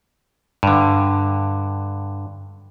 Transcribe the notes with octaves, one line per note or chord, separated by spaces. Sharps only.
G2 D3